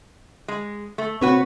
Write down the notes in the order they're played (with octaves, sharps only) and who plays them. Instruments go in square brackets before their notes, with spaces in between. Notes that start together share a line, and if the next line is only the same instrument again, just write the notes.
[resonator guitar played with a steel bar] G#3
A3
[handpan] A#3 C4 [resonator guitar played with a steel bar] F#4 B4 C#5